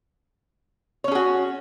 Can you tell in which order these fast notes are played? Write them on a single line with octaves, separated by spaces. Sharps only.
C#5 C#4 G#4 F#4